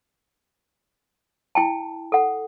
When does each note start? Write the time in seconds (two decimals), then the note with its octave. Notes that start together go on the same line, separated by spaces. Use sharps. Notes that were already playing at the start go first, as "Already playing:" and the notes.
1.55 E4 G5 A5
2.12 A4 F#5